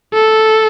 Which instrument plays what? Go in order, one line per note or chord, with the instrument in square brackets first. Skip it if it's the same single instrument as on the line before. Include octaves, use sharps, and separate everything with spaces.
[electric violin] A4